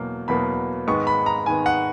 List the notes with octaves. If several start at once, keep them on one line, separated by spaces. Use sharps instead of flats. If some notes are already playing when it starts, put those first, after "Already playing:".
Already playing: E2 B2 F#3 A#3
E2 B2 F#3 A#3 B5
G#2 D#3 G#3 B3 C#6
B5
A#5
G#2 D#3 G#3 B3 G#5
F#5